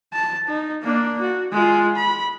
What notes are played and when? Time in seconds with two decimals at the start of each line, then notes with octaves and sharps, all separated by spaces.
0.13 A5
0.48 D#4
0.83 A#3 D4
1.21 F#4
1.52 G#3 F4
1.96 B5